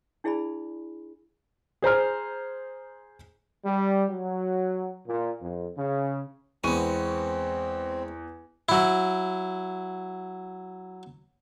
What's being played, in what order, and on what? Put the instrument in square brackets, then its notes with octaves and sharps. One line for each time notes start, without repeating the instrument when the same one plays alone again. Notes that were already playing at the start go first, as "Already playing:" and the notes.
[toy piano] D4 E4 G#4 D5 G#5 B5
[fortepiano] G#4 C5 A#5 F6
[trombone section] G3
F#3
A#2
F2
C#3
[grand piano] E2 C#6 D#7 [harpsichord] G#3 B3 [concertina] C4
[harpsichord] F#3 E4